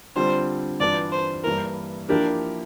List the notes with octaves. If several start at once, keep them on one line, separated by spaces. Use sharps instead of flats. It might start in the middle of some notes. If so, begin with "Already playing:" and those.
D3 G3 C4 F4 C5
G2 E3 G3 D4 F4 D5
C5
G2 E3 A#3 E4 A#4
F3 A#3 D4 E4 G4 A#4